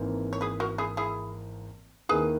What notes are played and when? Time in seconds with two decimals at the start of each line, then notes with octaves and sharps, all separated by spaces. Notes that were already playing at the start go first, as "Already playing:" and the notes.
Already playing: G#1 G#2 E3 A#3
0.33 C#5
0.41 G#4 B4
0.60 F#4 A#4
0.78 E4 G#4
0.97 E4 G#4
2.09 D#2 D#3 A#3 E4 G#4 B4